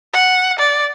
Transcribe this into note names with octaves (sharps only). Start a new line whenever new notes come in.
F#5
D5